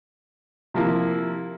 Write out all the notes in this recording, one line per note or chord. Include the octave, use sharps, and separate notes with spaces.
C3 F3 A#3 E4